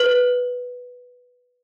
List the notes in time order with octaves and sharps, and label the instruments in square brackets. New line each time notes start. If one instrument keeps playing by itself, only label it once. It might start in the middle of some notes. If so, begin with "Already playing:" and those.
Already playing: [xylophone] B4